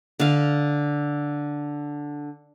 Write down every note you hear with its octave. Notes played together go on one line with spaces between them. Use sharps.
D3 F5